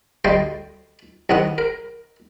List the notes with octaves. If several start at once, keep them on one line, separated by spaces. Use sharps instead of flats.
D2 G3 D#5 G5 C6
C2 D#3 B3 F#5 D#6
A#4